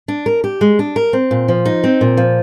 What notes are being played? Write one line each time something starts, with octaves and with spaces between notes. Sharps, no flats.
D4
A#4
G4
G#3
D4
A#4
C4
A#2
F3
D#4
C4
A#2
F3